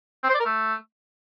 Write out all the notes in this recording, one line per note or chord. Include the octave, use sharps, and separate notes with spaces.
C4
C5
D5
A#4
A3